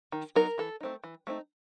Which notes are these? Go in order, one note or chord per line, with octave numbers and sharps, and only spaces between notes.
D#3
F#3 B3 D#4 A#4
E3 A4
A3 C4 D#4
E3
A3 C4 D#4